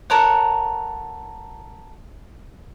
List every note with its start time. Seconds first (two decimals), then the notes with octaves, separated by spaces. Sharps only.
0.10 A4 A#4 C#5 F#5